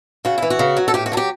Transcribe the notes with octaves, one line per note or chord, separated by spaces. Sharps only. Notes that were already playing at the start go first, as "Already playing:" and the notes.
C#3 F#4
E3 E4
F#4
C#3
F#3
A4
A2 G4
F#4
F#3 A4
G4